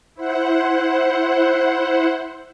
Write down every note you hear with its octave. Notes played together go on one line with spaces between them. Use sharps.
E4 C5 F#5